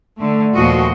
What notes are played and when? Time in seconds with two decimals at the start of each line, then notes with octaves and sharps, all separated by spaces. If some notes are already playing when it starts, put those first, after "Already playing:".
0.19 D3 A3
0.55 D#2 A#2 F3 A3 F#4 D#5